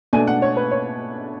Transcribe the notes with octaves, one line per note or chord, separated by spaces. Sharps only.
B2 A3 D4 G#5
F#5
C#5
B4
C#5